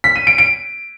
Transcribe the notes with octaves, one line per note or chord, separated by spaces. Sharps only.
B6
D#7
D7
D7